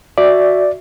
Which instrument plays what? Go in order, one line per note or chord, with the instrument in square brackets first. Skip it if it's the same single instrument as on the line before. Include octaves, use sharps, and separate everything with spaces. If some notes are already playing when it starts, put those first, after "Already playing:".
[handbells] F#4 E5 [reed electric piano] D5